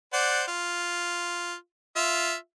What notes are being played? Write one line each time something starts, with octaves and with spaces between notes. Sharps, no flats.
C5 D5 F#5
F4
F4 E5